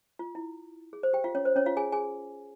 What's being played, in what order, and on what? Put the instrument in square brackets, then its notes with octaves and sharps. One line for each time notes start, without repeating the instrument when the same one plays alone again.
[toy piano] F4
E4
G#4
C5
G4 G5
F4 F5
C#4 C#5
C5
C#4 C#5
F4 F5
G#4 G#5
G#4 G#5